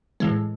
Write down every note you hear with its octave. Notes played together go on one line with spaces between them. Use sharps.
A2 E3 G#3